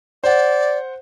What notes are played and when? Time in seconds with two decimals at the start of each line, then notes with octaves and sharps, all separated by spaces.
0.24 C5 D5 F#5